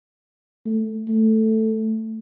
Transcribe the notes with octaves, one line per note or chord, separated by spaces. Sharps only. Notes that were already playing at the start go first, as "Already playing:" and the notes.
A3
A3